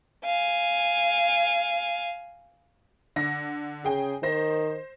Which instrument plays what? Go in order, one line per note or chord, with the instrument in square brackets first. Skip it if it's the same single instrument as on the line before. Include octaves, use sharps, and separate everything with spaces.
[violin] F5 G#5
[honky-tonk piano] D3 A#6
[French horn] C#3 [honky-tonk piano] G#4 G5
[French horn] D#3 [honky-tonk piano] C5 A#6